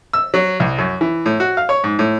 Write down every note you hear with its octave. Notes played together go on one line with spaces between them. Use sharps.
E6
F#3
C2
F#2
E3
A2
F#4
F5
C#5
G#2
A2